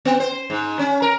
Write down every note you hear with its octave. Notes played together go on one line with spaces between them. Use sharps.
B3
C5
G#2
C#4
A#4